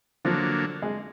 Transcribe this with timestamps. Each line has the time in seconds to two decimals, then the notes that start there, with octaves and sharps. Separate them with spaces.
0.25 D3 F3 F#3 A#3
0.82 G#3